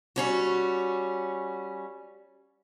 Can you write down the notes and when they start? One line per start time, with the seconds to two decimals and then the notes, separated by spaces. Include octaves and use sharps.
0.16 G3 C#4 F#4